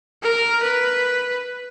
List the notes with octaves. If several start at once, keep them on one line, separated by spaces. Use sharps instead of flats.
A#4
B4